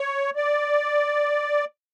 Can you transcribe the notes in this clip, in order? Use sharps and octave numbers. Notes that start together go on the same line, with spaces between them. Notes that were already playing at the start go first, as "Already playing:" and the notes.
Already playing: C#5
D5